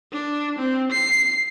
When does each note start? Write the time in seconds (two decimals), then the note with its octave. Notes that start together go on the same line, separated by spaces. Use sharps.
0.13 D4
0.59 C4
0.92 C7